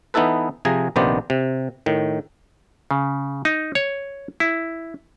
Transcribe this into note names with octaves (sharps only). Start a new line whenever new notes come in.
E3 B3 D#4 E4 A4 B4
C3 F3 G#4 G#5 A#5
A#1 C3 D#3 B3 C5 D5
C3
A2 D#3
C#3
D#4
C#5
E4